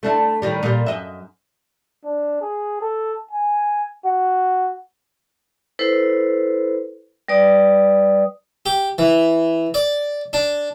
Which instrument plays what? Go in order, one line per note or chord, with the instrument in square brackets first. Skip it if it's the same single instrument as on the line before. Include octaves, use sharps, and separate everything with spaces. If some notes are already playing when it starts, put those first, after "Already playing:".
[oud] A3 D4 E4
A2 D#3 G3
A#2 G3
F#2 D#5 E5
[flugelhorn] D4
G#4
A4
G#5
F#4
[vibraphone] E4 A4 B4 C5
G3 B4 D5 D#6
[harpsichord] G4
E3
D5
D4